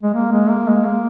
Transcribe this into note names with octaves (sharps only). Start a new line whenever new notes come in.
G#3
A#3
G#3
A#3
G#3
A#3